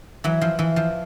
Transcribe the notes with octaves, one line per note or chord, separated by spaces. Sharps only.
E3 F#3
F3
E3
F3